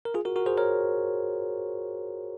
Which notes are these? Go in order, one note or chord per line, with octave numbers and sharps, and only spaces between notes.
A#4
F4 G#4
F#4 A#4
F#4 A#4
G#4 C5
A#4 C#5